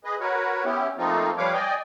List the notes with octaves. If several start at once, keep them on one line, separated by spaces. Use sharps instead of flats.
G#4 B4 D#5
F#4 A#4 B4 C#5
B3 C#4 E4 G4
F3 A3 A#3 C4 D#4 F4
F3 G3 B4 C#5 F5 D6
D5 D#5 G5 G#5